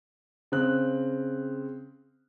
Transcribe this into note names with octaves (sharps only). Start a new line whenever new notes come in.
C#3 C4 F#6